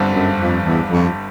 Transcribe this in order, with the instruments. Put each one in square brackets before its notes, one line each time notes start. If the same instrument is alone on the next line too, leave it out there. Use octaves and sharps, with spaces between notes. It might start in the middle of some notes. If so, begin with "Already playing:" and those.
Already playing: [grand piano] G1 G2 D3 G3 C4
[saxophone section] F#2
F2
E2
F2